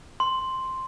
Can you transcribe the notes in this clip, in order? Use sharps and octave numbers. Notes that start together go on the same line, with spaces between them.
C6